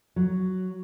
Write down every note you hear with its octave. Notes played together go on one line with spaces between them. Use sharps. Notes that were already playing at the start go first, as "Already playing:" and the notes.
F#3